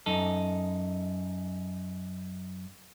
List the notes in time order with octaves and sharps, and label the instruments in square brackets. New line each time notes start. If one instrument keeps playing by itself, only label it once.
[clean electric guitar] F#2 D#4 A4